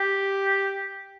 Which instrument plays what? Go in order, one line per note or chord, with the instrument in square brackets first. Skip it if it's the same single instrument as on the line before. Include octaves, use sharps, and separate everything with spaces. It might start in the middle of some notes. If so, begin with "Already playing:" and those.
Already playing: [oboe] G4